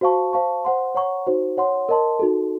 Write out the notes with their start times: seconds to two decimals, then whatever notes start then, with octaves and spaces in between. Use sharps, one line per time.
0.01 F#4 C5 F5 A5 C#6
0.33 C5 F5 A5 C#6
0.65 C5 F#5 C6
0.95 C#5 F#5 A#5 C#6
1.27 D#4 F#4 C5
1.57 C#5 F#5 C6
1.89 A#4 D#5 A5 C6
2.19 D#4 F#4 A4